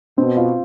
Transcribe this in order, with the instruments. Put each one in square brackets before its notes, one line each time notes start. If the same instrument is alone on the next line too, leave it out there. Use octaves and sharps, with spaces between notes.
[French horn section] B2 [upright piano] C4
[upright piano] F4